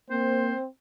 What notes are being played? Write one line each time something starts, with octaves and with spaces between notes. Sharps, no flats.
A#3 C4 C5